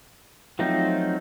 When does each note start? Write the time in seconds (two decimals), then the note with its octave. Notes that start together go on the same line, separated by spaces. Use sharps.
0.59 F3 F#3 A3 C4 D#4